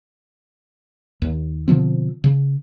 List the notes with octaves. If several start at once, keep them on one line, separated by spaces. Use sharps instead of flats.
D#2
B2 D3 F3 C4
C#3